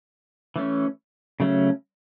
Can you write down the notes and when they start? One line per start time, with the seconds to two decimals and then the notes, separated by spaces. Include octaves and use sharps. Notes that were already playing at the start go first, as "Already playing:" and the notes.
0.56 E3 A3 C#4
1.40 C#3 F#3 A3 C#4